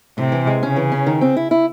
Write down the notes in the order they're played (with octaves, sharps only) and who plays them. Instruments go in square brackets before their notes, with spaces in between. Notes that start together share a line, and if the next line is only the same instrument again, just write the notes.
[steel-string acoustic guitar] A2 [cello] C3
[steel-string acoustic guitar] E3
G#3
[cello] C#3 [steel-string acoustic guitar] C#4
[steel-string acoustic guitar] E3
C#4
D#3
C4
E4
E4